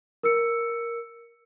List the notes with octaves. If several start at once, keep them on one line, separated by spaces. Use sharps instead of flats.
A#4 E6 C#7